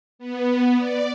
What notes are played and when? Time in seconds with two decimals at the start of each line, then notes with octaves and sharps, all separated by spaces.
0.19 B3
0.77 D5